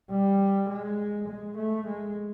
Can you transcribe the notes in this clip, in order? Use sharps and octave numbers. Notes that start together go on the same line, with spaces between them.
G3
G#3
G#3
A3
G#3